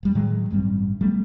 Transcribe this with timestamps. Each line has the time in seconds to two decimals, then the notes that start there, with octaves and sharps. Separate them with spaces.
0.03 E1 G3
0.15 A2 D#3 F#3 G#3
0.51 A1 G2 G3 C4
1.01 F#3 G3 A3 B3